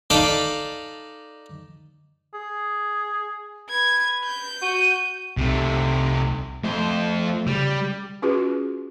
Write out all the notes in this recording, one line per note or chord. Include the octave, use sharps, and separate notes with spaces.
D#4 A4 D5 F5 B5
G#4
B4 G#6
G6
F#4 D#7
C2 C3 A3
F2 A3 C5
C#3 G3
C#4 F4 F#4 G#4 B4